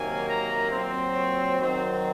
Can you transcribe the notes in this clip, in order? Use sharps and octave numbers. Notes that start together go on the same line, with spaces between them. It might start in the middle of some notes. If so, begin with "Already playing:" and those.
Already playing: C3 D#3 F#3 A#3 G#5
A#5
A#2 F#3 C4
C#5
D#3 F#3 C4 C5